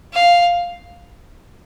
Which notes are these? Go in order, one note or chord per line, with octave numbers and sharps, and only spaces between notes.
F5